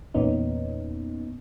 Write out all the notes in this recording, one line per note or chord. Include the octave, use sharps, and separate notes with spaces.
E2 A#2 B3 C#4 D#4